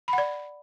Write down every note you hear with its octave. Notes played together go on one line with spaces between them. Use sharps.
B5
F#5
D5